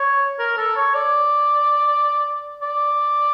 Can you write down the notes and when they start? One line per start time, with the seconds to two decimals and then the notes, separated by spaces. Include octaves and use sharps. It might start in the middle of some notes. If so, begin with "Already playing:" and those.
Already playing: C#5
0.39 A#4
0.57 A4
0.76 C#5
0.94 D5
2.62 D5